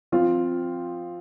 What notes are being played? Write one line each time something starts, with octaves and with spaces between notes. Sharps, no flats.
F3 C4 F4